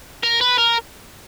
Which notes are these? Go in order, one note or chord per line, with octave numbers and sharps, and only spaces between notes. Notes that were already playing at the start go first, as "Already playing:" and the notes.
A#4
B4
A#4